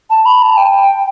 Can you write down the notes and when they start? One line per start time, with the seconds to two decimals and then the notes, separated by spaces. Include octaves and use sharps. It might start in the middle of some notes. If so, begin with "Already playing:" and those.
0.10 A5
0.26 B5
0.43 A5
0.57 G5